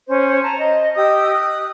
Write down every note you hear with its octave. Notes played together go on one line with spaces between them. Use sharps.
C#4 C5
A5 A#5
D#5
G4 D#5 D#6 E6
D#6 F#6